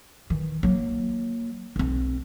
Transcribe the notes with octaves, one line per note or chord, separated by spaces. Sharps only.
D#3 E3
F#3 A#3
B1 C4